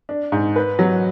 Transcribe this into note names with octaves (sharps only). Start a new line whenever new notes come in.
D4
G#2
B4
F#3